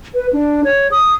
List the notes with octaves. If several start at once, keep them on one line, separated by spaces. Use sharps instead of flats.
B4
D4
C#5
D#6